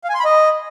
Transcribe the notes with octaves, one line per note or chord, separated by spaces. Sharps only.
F5
G#5
C6
B5
D#5